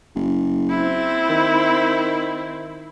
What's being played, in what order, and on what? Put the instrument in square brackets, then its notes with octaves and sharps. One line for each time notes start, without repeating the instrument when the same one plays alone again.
[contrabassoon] F#1
[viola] C4 E4
[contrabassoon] D#3